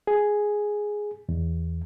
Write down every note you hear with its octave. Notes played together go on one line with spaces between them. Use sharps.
G#4
E2